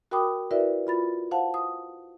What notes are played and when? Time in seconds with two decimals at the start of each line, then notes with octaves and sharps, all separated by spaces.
0.11 F#4 A#4 G5 B5 D6 D#6
0.51 E4 F#4 A#4 B4 D5 E5
0.87 F4 B5 A6
1.31 C5 F5 F#5 A5
1.54 D#6